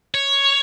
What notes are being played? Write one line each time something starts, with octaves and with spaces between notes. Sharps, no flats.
C#5